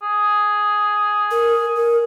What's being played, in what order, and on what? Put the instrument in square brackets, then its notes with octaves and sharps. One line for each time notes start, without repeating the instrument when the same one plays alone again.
[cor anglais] G#4
[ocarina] A#4
A#4